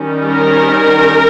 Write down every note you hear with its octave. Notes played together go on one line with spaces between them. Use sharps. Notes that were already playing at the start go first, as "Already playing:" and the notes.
Already playing: D#3 G3 C#4
A#4